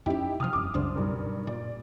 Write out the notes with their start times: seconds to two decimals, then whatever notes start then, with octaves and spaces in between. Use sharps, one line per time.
0.06 F2 C#4 D#4 E4 G4
0.40 C3 F3 D#6 F6
0.53 E1 F#2 D6
0.74 C2 F#2 C#3 D4 C5
0.95 B1 G2 A#4
1.47 A#2 D5